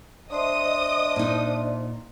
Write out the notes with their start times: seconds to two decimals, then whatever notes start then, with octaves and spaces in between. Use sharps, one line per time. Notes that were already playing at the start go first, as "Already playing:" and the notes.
0.32 D4 C5 D#5 E5 C6 D#6
1.16 A#2 D#4